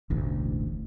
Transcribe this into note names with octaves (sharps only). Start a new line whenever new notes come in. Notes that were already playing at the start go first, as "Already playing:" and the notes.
E1 A1 D2